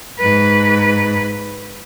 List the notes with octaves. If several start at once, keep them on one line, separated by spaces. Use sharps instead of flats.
G#2 B4